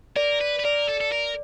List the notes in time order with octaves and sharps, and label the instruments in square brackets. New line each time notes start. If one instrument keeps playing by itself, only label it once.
[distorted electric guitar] A#4 [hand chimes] D5
[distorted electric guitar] B4
B4
[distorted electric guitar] A#4 [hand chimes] D5
[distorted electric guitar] A4
A4
A#4